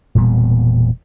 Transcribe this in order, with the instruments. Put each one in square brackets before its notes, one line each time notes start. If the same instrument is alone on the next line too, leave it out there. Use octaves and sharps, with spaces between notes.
[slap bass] E1 A#2 G3 B3